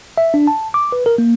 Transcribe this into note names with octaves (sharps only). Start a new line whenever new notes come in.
E5
D4
A5
D6
B4
A#4
A#3